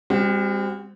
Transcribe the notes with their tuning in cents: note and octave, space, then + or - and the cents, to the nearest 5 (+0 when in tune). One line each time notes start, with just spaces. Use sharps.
G3 +45 C4 -10 F#4 +10